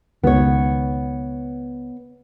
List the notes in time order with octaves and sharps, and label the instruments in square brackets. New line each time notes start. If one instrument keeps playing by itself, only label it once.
[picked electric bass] C#2 D#3 [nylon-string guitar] B3 C#5